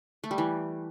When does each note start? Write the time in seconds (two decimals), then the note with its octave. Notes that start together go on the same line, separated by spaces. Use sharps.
0.24 A3
0.31 G3
0.38 E3